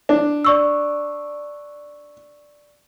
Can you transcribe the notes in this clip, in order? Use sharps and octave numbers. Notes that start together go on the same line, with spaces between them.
D4
D5 C#6 E6